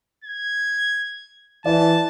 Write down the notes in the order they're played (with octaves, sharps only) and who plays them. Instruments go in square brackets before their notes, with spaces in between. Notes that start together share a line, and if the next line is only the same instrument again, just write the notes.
[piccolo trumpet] G#6
[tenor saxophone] E3 [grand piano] D5 [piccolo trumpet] A5